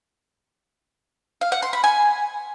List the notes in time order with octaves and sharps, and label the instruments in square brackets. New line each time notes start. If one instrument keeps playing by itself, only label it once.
[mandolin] F5
F#5
C6
B5
G#5